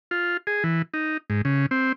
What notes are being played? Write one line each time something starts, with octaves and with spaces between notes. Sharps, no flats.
F4
G#4
E3
D#4
G#2
C#3
C4